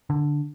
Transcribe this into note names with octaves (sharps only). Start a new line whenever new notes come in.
D3